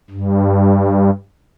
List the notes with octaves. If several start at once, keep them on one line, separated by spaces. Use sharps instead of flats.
G2